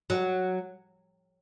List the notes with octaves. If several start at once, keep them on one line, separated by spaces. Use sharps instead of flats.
F#3